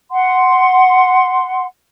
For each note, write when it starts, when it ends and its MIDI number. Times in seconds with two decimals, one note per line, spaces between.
0.11 1.64 78
0.11 1.64 84